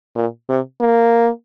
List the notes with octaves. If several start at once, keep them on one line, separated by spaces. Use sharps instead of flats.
A#2
C3
A#3